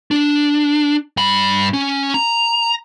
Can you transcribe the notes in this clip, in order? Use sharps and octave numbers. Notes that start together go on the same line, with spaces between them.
D4
G2 B5
C#4
A#5